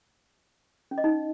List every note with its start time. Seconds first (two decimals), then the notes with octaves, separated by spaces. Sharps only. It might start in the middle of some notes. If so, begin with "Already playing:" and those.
0.91 C#4
0.98 D#5
1.04 D#4